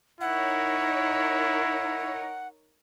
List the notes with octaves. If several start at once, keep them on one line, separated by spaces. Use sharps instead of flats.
D#4 E4 A#4 C#5 F#5